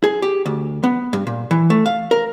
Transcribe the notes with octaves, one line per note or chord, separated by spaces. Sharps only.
G#4
G4
D2
B3
G2
A#2
E3
A3
F5
A#4